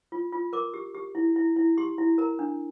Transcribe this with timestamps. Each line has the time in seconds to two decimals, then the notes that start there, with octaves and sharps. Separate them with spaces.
0.12 F4
0.33 F4
0.53 A#4 D6
0.74 G4
0.95 G4
1.15 E4
1.36 E4
1.56 E4
1.78 G4 C6
1.98 E4
2.18 A#4 A#5
2.39 D4